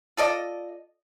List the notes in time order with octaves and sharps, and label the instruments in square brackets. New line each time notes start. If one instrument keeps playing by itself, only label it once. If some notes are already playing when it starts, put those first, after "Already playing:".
[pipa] F4 A4 D5 D#5